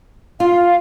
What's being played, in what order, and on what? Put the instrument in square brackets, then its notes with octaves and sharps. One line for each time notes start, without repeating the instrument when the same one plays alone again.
[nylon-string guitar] F4 [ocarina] F5